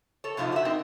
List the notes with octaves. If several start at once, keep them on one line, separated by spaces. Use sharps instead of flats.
A4 C#5
F#2 C3 F3 A3 D#4 F4
F#4 E5
C4 D#4 A#4